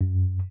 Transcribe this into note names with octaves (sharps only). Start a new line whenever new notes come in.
F#2